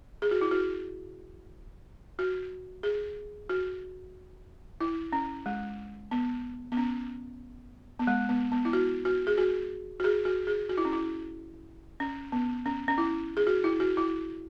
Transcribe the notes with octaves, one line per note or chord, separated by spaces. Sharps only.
G#4
F#4
E4
F#4
F#4
G#4
F#4
E4
C#4
G#3
B3
B3
C#4
B3
G#3
B3
B3
E4
F#4
F#4
G#4
F#4
F#4
G#4
F#4
G#4
F#4
E4
C#4
E4
C#4
B3
C#4
C#4
E4
G#4
F#4
E4
F#4
E4